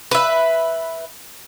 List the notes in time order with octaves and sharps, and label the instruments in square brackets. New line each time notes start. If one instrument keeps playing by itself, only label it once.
[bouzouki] B4 E5